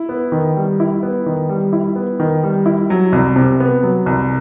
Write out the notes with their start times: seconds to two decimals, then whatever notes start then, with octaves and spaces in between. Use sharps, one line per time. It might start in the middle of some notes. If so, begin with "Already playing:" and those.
Already playing: E4
0.09 B3
0.32 D#3
0.56 G3
0.80 E4
1.03 B3
1.26 D#3
1.49 G3
1.73 E4
1.96 B3
2.20 D#3
2.43 G3
2.66 E4
2.90 F#3
3.13 C2
3.36 C3
3.60 B3
3.83 F#3
4.06 C2